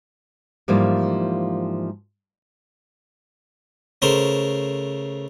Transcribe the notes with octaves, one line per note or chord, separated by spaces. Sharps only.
G#2 E3 F3 G3 A#3 F4
C#3 A3 A#4 C5 C6